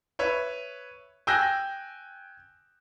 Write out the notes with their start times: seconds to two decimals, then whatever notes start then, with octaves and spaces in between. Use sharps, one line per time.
0.19 B4 C#5 E5
1.27 G5 G#5 E6 F#6 G6 A#6